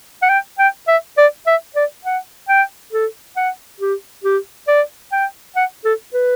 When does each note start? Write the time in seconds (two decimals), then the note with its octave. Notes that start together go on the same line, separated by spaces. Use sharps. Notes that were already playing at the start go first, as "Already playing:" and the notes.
0.22 F#5
0.29 G5
0.59 G5
0.88 E5
1.18 D5
1.47 E5
1.76 D5
2.05 F#5
2.49 G5
2.93 A4
3.36 F#5
3.80 G4
4.24 G4
4.68 D5
5.12 G5
5.56 F#5
5.85 A4
6.14 B4